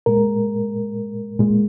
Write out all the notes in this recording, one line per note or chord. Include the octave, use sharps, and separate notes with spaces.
A#2 G#3 A#4
A#2 G#3